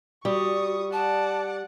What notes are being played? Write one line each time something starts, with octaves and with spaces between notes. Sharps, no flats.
G3 F#4 C#6 D#6
D5 F#5 A5